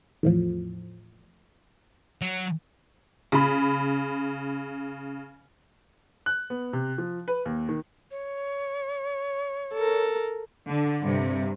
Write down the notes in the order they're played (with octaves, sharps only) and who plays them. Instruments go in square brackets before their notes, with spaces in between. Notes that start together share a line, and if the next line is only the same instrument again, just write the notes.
[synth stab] E2 A2 F3
[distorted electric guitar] F#3
[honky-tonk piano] C#3 B5
[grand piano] F#6
B3
C3
F3
B4
D#2
D#3
[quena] C#5
[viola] A4 A#4
[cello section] D3
G2 C3